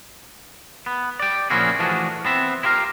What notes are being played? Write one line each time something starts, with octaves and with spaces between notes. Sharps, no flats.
B3
D5 G5
A#2 F3 C#4 E4 F#4 G#4
E3 F3 A3 D4 F#4 G#4
B3 C4 E5
E4 F4 G4 A#4 F5